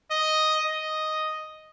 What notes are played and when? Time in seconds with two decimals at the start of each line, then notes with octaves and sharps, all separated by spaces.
0.11 D#5
0.65 D#5